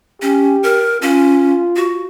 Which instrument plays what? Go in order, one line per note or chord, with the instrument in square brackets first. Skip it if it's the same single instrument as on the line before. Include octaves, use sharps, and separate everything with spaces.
[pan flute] C#4 [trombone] G4
[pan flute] A#4
[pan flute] C#4 [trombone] F4
[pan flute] F#4